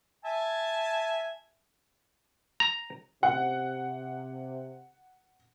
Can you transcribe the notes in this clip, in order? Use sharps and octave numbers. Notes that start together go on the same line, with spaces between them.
E5 G#5 A5
A#5
C3 F#5